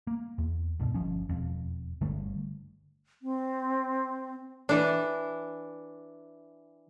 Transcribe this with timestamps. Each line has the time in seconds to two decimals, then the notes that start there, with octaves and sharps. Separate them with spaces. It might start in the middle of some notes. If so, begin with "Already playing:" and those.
0.07 A#3
0.38 E2
0.79 C2 G2 B2
0.94 G1 E2 F3 C#4
1.29 E1 F2
2.01 G1 D3 G3 A3
3.22 C4
4.69 E3 D4